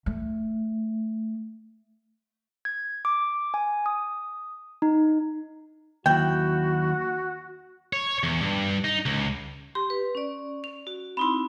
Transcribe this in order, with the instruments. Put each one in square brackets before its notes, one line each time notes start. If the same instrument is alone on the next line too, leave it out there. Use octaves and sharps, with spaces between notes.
[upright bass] A3
[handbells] G#6
D6
G#5
D#6
D#4
[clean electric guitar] D#2 F#3 E4 [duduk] F#4 [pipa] G5
[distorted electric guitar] C#5
E2
G2
D#4
C#2
[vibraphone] G4 [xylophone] C6
[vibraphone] B4
C#4 D5
[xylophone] F7
[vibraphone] F#4
[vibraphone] C4 D#4 E4 [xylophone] B5 C6